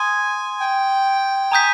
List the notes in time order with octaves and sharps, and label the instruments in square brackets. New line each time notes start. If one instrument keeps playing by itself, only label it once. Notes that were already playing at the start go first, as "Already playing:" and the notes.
Already playing: [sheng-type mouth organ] G#5 [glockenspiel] C6 D#6 G#6
[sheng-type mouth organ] G5
[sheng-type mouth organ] G#5 [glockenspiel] A#5 D#6 G6 B6